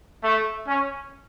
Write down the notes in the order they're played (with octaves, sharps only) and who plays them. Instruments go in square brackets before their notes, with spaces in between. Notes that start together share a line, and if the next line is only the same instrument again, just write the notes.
[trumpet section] A3
C#4